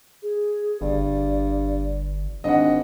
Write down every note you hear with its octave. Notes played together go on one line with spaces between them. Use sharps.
G#4
G1 G2 D5
G#1 D4 D#5 F#5